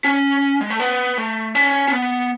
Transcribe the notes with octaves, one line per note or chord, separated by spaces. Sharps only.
C#4
G#3
A3
B3
A3
C#4
C#4
B3